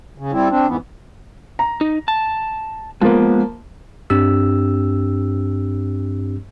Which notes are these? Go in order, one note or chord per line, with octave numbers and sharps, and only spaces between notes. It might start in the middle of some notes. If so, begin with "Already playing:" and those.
C#3
G3 C4 E4
C4 D4
F2 G#2 E3 B3
A#5
D#4
A5
F3 G#3 A#3 B3
G2 C4 D4 G4 E6